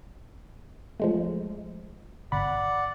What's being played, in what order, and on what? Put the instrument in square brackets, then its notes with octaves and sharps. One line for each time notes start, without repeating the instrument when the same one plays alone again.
[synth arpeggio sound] F3 G#3 A3
[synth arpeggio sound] G1 B5 [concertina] D5 F#5